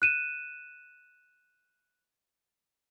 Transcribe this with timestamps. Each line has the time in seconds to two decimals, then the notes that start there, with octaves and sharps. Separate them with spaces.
0.02 F#6 D#7 E7